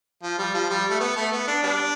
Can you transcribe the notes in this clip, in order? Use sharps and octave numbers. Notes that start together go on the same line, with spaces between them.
F3
G3
F3
G3
A3
B3
A3
B3
D4
G3 B3 D4